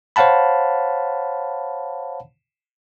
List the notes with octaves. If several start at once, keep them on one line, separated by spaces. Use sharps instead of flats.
C5 C#5 F5 F#5 A5 B5